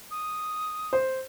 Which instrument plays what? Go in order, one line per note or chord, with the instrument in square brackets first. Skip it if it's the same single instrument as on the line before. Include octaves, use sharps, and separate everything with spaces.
[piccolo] D#6
[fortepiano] C5